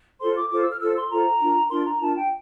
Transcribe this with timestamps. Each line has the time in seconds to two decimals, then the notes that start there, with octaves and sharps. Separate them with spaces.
0.21 F4 A4 C5 C6
0.36 D6
0.51 F4 A4 C5 D6
0.61 E6
0.70 F6
0.80 F4 A4 C5 E6
0.96 C6
1.10 F4 A4 C5 A#5
1.41 D4 F4 A#4
1.70 D4 F4 A#4 C6
1.86 A#5
2.01 D4 F4 A#4 A5
2.16 G5